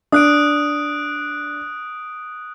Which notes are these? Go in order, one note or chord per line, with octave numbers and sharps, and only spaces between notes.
D4 D#6 F#6 D7